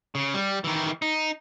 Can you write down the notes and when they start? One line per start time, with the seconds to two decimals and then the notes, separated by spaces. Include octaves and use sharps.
0.15 C#3
0.34 G3
0.64 D#3 E3
1.02 D#4